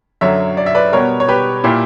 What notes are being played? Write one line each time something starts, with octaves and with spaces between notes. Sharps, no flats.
F#2 D3 F#3 C#5 E5
D5
E5
B4 D5
B2 G3 B3 A#4 C#5
C#5
G4 B4
A#2 A#3 E4 G4